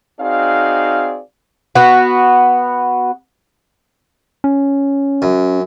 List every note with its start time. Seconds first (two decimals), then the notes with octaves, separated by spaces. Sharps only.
0.20 C4 D#4 F#4 G#4 D5 F5
1.75 B3 F#4
4.44 C#4
5.22 F#2